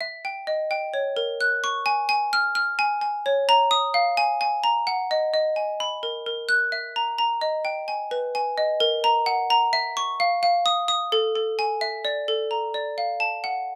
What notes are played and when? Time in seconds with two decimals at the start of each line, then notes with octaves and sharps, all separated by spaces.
0.01 E5
0.25 G5
0.47 D#5
0.71 G5
0.94 C#5
1.17 A#4
1.41 F#6
1.64 C#6
1.86 G#5
2.09 G#5
2.33 F6
2.55 F6
2.79 G#5
3.01 G#5
3.26 C#5
3.49 A#5
3.71 D#6
3.94 F5
4.17 G#5
4.41 G#5
4.64 A#5
4.87 F#5
5.11 D#5
5.34 D#5
5.56 G#5
5.80 B5
6.03 A#4
6.26 A#4
6.49 F#6
6.72 E5
6.96 A#5
7.18 A#5
7.41 D#5
7.65 G5
7.88 G#5
8.11 B4
8.35 G#5
8.58 D#5
8.80 A#4
9.04 A#5
9.26 F#5
9.50 A#5
9.73 E5
9.97 C#6
10.20 F5
10.43 F5
10.66 D#6
10.88 D#6
11.12 A4
11.36 A4
11.59 G#5
11.81 E5
12.05 D5
12.28 A4
12.51 A#5
12.74 D5
12.98 F5
13.20 A5
13.44 F#5